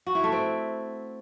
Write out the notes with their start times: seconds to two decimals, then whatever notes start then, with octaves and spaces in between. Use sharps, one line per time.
0.06 F#4
0.15 E4
0.24 A3
0.32 C4